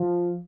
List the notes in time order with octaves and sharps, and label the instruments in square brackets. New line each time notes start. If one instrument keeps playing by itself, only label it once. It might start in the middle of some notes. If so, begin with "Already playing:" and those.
Already playing: [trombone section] F3